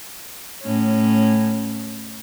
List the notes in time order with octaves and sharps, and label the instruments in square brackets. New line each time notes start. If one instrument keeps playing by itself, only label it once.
[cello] A2 C#4